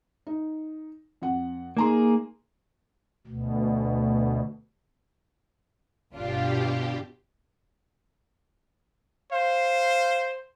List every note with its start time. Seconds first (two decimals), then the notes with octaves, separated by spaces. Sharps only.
0.27 D#4
1.22 F2 F#5
1.77 A#3 D#4 G#4 A#5 C6
3.27 D2 B2
6.14 G1 B2 D4 F4 G4
9.32 C5 F5